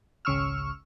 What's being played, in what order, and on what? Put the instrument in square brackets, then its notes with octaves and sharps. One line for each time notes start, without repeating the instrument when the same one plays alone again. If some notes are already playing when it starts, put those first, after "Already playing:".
[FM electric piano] G#1 C#2 C#3 C#6 E6 F6